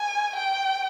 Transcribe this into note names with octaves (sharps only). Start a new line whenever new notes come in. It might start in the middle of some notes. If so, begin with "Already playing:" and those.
Already playing: G#5
G5